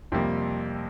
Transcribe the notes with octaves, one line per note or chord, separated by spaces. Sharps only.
F2 C3 G3 A#3